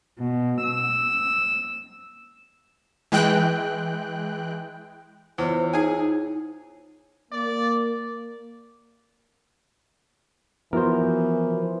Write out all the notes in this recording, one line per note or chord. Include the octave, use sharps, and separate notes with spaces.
B2
E6
E3 G#3 G5 F#6
E2 E4 F4 C5 C#5
D#4 G#4 G#5
A#3 D5
E3 F3 B3 E4 F#4 A#4 C5